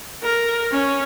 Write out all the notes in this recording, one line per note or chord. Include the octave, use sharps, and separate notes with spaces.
A#4
C#4